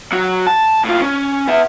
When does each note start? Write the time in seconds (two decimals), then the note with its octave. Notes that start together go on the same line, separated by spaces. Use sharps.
0.12 F#3 F#4
0.47 A5
0.85 A2 F4
1.02 C#4
1.48 B3 E5